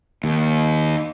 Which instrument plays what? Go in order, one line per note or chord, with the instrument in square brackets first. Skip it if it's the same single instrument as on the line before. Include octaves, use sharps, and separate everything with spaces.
[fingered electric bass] D#2